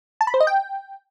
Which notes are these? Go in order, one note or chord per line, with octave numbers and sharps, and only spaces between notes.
A5
B5
C5
D#5
G5